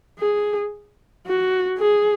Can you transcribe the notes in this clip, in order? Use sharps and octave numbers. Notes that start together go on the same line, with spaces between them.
G#4
F#4
G#4